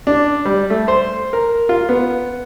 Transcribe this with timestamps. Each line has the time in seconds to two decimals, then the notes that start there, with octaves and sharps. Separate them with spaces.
0.07 D4
0.45 G3
0.70 A3
0.88 C5
1.33 A#4
1.69 F4
1.89 B3